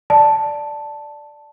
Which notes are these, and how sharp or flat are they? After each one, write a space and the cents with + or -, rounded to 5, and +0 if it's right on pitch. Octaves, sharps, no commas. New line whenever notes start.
D5 +0 A5 +0